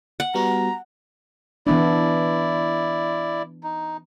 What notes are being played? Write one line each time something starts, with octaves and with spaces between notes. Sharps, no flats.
F#5
G3 B3 F#4 A#5
E3 B3 D4 E4 D5
D#4